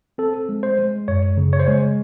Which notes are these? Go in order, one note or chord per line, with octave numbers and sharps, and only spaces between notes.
C4 A4
G#3
C5
G#3
F#2 C#5
C#3
C#5
C5
G#3 C#5